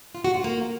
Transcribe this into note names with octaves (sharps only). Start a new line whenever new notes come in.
F4
F#4
F4
A#3